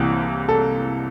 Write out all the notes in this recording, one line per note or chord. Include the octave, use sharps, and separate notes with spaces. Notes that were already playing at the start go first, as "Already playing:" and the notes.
Already playing: C2 C3 E3 A#3
A4